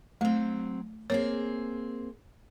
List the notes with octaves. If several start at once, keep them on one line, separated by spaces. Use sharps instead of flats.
F#3 A3 C4
A#3 C4 G#4 C#5